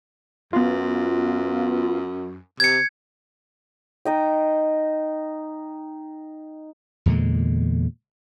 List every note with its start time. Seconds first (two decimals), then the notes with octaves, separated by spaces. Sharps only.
0.53 F#2 B3 F4
2.60 C3 G#6 C#7
4.05 D#4 D#5 G5
7.06 E2 A#2 D3 G#3